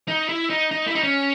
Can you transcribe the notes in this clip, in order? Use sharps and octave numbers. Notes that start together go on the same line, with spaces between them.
D#4
E4
D#4
D#4
E4
D#4
C#4